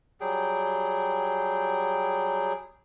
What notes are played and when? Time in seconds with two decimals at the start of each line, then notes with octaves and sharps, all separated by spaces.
0.21 F#3 G3 G#4 G5